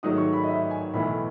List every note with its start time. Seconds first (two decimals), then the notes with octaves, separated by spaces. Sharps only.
0.03 G#2 D#3 F#3 A3 D#6
0.18 C#6
0.33 B5
0.44 D#5
0.48 E5
0.71 G#5
0.94 B1 A2 E3 A3 B5